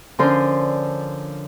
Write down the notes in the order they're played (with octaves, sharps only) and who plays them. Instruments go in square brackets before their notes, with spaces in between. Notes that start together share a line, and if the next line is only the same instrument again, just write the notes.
[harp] D3 F3 C#4 A#4 C5 C6